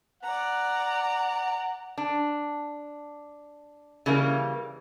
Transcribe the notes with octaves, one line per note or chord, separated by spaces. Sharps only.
D5 F#5 A#5
D4
C#3 E3 G3 A#3